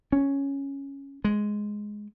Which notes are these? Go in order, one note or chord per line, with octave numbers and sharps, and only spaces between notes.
C#4
G#3